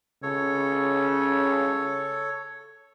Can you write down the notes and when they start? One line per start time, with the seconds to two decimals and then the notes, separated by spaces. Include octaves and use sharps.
0.23 C#3 A4 C#5